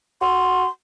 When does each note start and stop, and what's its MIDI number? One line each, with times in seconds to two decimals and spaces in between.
0.21 0.65 66
0.21 0.68 84